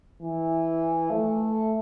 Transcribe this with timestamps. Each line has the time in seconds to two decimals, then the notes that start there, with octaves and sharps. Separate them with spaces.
0.21 E3
1.10 A3